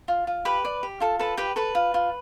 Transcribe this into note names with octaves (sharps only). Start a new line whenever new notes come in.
F4
F4
G4 B4 B5
D5
G4
F4 A4 A5
A4 B4 A5
G4 B4 G5
A4 B4 B5
F4
F4